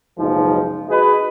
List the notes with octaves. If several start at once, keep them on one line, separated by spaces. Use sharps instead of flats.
F#1 B1 F3 G#3 D#4
F#4 G#4 B4 D#5